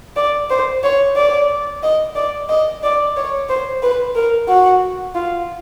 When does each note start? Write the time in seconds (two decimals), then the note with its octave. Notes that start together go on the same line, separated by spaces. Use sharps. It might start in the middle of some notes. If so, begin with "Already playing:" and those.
0.16 D5
0.50 C5
0.83 C#5
1.16 D5
1.83 D#5
2.16 D5
2.49 D#5
2.83 D5
3.17 C#5
3.49 C5
3.83 B4
4.15 A#4
4.48 F#4
5.15 F4